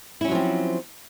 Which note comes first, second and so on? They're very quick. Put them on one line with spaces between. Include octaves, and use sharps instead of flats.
E4 C#4 F#3 F3 C4